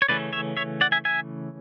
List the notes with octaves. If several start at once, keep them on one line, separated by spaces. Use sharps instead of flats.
C#5
C#3 E3 A3 C#4 B4 D5
C#5 E5
C#5 E5
D5 F#5
E5 G#5
E5 G#5